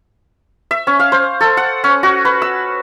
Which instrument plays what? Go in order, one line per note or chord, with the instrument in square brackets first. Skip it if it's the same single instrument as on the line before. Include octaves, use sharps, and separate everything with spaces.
[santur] E5
C#4
F5
C5
A4
F#5
C#4
F#4
B4
E6